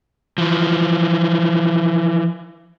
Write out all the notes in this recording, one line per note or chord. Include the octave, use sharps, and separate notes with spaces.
E3 F3